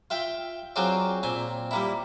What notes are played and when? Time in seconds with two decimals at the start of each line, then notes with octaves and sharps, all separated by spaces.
0.10 F4 E5 G5
0.76 F#3 C4 F4 G#4 C5 D5
1.23 A#2 C4 G#5
1.71 G3 A#3 E4